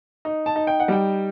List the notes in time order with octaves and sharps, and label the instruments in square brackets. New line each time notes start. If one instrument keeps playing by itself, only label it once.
[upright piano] D#4
A5
D#4
G5
F#5
G3 G5